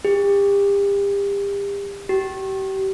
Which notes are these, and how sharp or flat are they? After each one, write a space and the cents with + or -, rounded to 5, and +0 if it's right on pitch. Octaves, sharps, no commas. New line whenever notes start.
G4 +35
G4 -35